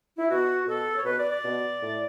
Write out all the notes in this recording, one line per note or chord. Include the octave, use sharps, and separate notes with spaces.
E4
B2 F#4
B2 A4
C#5
B2 B4
D5
D5
B2
A2